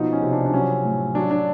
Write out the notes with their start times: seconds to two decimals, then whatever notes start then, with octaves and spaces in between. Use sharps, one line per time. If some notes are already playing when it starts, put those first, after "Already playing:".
Already playing: B2 F3 D#4
0.13 C#4
0.22 C3
0.32 D4
0.46 D4
0.54 F#3 C#4
0.85 A2
1.15 F#3 D4
1.31 D4